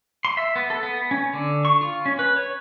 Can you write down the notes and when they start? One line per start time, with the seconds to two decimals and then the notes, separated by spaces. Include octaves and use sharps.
0.25 C6
0.37 E5
0.56 B3
0.70 A4
0.83 B3
1.11 C#4
1.33 D3
1.65 C#6
1.81 F4
2.06 C#4
2.19 B4
2.36 C#5